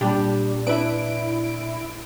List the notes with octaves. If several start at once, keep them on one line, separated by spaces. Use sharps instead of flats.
A#2 G3 D4 G4
D4 E4 B4 D7